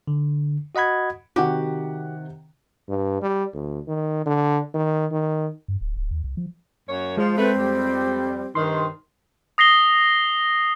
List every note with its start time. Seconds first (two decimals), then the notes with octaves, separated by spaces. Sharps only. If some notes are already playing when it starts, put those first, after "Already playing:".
0.08 D3
0.75 F#4 D#5 F#5 B5 G#6
1.36 C3 D#3 F#4 G4 F#5
2.89 G2
3.22 G3
3.54 D2
3.88 D#3
4.26 D3
4.74 D#3
5.12 D#3
5.68 G2
5.81 D1
5.96 D1
6.11 D#2
6.24 C2
6.37 F3
6.88 F#2 A#3 C#5
7.17 F3 G#3
7.37 A3 C4 B4
7.57 F2 G3
8.55 G2 C3 D#3 C6
9.58 D#6 A#6 C7 G7